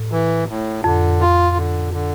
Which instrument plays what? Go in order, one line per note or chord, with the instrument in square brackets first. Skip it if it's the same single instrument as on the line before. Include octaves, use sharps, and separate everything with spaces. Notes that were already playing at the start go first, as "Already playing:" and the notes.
Already playing: [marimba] A2
[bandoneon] E3
A2
[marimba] F2 [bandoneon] D3
[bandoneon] F4
D3
D3